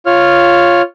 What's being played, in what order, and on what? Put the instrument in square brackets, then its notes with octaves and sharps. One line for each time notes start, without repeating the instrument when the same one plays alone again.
[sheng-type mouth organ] F4 C#5 F6